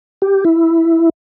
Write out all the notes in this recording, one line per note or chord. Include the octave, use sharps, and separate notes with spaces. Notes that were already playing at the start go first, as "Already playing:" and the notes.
G4
E4